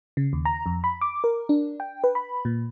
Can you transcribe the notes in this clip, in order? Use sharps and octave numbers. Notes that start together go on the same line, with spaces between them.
C#3
D#2
A#5
F2
B5
D6
A#4
D4
G5
B4
B5
A#2